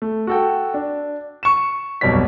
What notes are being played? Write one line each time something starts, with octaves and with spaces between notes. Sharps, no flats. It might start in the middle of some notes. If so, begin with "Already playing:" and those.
A3
F#4 A4 G5
D4
C#6 E7
F1 B1 G2 B2 C#5 B6